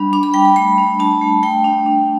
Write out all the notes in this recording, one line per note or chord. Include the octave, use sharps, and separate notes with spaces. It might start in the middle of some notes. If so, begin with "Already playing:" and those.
Already playing: G3 D4 B5
D4 D6
B5
G3 G5
B5
A3 B5
D4
D4 A5
A3
A3 G5
D4
D4